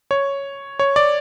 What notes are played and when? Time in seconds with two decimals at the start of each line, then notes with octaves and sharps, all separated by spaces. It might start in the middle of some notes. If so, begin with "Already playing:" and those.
0.11 C#5
0.79 C#5
0.96 D5